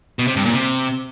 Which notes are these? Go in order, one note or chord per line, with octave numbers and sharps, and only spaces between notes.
B2
C3
G2
A#2
C3